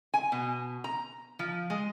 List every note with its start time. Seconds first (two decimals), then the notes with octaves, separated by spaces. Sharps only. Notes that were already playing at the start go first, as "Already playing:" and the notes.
0.14 G#5
0.32 B2
0.84 A#5
1.39 F3
1.70 G#3